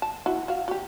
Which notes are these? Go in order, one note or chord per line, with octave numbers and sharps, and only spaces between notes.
A5
E4 F#4
F#4 F5
F#4 G4